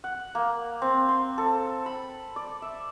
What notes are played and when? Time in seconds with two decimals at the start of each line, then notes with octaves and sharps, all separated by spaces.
0.04 F#5
0.35 A#3
0.82 C4
1.09 C6
1.38 A4
1.86 B5
2.36 D5
2.62 E5